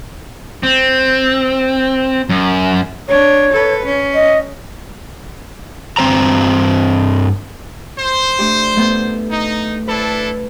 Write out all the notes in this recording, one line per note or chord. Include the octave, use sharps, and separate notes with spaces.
C4
F#2
D4 C#5
A4 B4
C#4
D#5
G2 C4 C5 A#5
C5
A3 D4 G4
A3 B3 G4
D#4
D4 E4 A4 B4